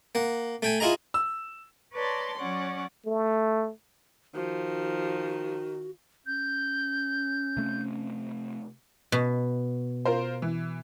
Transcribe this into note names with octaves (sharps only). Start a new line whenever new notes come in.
A#3 F#5
A3 G5 G#5
E4 F4 G#4 D#5 A#5
E6
B4 C#5 D5 A5 A#5 C6
F#3 C#4 C#5 D5 F#5
A3
D#3 F3 F#4
C#4 G6
C3 A3 C4
B2
F4 A#4 C5
E3